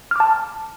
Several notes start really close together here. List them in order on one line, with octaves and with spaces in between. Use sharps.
F6 D6 A5